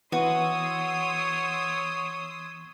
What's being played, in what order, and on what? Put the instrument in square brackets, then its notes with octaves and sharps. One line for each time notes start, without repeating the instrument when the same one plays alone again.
[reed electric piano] E3 B3 [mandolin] F#4 [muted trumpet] C#5 [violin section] C6 D#6 E6